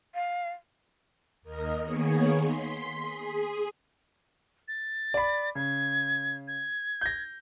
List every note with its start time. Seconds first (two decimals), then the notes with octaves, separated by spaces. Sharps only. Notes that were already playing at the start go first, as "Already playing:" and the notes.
0.15 F5
1.42 D#2 A#4 D#5
1.82 D#3 A#3 B3 G#4 C#5
2.39 C6 B6
3.00 G#4
4.68 A6
5.14 D5 B5
5.55 C#3 G#6
6.48 G#6
7.01 G6 A#6